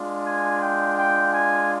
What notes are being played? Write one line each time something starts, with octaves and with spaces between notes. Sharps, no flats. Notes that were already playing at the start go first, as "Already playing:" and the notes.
Already playing: G#3 D4 F4
G#5
G5
G5
G#5